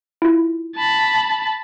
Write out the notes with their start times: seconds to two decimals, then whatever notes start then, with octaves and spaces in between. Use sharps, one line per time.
0.22 E4 F4
0.75 A5 B5